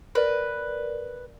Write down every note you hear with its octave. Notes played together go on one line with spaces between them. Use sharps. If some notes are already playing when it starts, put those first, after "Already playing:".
A#4 B4 D5